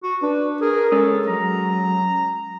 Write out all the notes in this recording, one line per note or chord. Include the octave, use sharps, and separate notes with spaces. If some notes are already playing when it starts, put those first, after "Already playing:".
F#4
D4 B4
G#4 A#4
G#3 C#4 A4 D#6
F#3 A#5